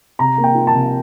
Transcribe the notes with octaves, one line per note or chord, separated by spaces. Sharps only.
C3 A#5
A#3
G5
F4
A5
C3